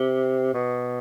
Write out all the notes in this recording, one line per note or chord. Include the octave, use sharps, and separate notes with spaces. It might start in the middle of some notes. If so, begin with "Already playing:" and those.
Already playing: C3
B2